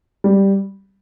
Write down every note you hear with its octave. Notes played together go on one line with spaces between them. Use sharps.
G3